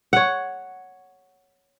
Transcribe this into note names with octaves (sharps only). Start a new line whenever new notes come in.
C#5 F#5